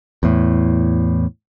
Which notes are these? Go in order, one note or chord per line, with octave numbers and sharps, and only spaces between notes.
E2 A2